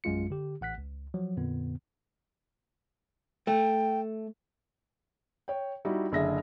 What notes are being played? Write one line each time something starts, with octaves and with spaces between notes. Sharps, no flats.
A#1 F#2 G#3 F4 C#7
D3 G4
A1 F#5 F#6 B6
C#2
F3 F#3
F2 A#2 D3 B3
A3 G5
C#5 G5
G3 D#4 E4 F#4
F#1 D3 G#4 E5 A#6